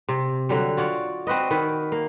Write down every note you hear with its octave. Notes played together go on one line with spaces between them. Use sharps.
C3
D3 F#3 G3
F4 F#4 C#5 D5
C4 F#4 B4 D#5
D#3 B4
A#3